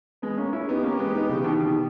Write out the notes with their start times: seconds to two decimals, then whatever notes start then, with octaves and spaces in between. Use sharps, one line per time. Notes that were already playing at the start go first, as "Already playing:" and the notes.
0.22 G#3 B3
0.37 A#3 C#4
0.53 C#4 E4
0.68 B3 D#4 G4
0.83 A#3 C#4
0.99 G#3 B3
1.14 B3 D#4
1.29 C#3 E3
1.44 B2 D#3
1.60 B2 D#3